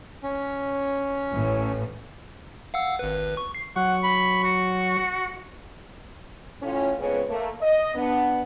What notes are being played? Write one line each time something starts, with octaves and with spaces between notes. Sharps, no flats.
C#4
A1 A2
F5 F#5 E6
G#1 B4
C#6
C7
F#3 F#5 C#6
B5
F#4
A2 C#4 F4
F2 C#3 G#3 B3 B4 C#5
A3 A#3
D#5
B3 D4